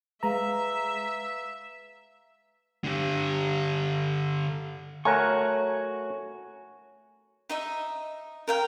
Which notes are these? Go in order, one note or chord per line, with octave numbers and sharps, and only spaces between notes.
G#3 B4 E5 F5 A#5
D3 G4
A3 F#4 A#4 C#5 F#5 G#5 C#6
D#4 D#5 E5
A#4 F5 G5